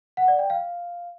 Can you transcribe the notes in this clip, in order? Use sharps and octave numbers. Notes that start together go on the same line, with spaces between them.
F#5
D5
G5
F5